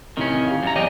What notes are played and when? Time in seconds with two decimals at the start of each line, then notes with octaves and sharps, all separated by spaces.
0.17 A1 C3 D#3 C#4
0.47 G4 F5
0.63 F#2 A#5
0.76 E2 G4 D5 D#5 G5 G#5